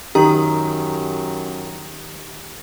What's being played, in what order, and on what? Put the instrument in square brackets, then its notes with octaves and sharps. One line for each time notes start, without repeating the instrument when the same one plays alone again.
[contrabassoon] F#2 [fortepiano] D#3 [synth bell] G4 A#5